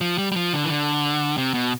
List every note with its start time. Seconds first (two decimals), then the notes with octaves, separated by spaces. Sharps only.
0.01 F3
0.18 G3
0.32 G3
0.36 F3
0.53 D3
0.64 E3
0.69 D3
1.38 C3
1.54 B2